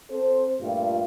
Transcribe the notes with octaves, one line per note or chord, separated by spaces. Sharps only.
C4 A4 C5
G2 A#2 A3 F4 G4